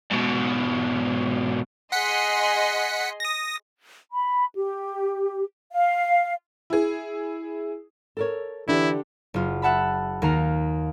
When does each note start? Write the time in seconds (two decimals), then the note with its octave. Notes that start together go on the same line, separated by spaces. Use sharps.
0.12 G#2 B2
1.92 G#4 D#5 F#5 C6 B6 C#7
3.20 D#6 A#6
4.11 B5
4.55 G4
5.73 F5
6.70 E4 G#4
8.17 A4 A#4 C#5
8.68 D3 E3 D4 E4 G4
9.34 F#1 F4
9.62 E5 F#5 A5 B5
10.22 D#2 D#3 F5 A#5 C7